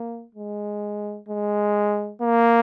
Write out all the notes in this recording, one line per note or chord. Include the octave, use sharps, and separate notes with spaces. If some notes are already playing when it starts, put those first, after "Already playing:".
Already playing: A#3
G#3
G#3
A#3